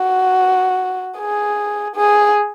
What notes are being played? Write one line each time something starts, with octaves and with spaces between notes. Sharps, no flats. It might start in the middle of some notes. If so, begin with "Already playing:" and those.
Already playing: F#4
G#4
G#4